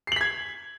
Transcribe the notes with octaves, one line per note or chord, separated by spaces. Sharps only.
G#6 B6 C7 F#7